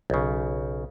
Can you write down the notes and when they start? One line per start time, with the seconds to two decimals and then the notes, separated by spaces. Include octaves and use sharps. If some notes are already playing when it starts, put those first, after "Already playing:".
0.10 B1 C#3